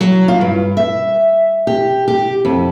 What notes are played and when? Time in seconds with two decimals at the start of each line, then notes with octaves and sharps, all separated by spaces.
0.01 F#3
0.28 F4
0.41 G2
0.77 E5
1.67 G4
2.08 G4
2.45 F2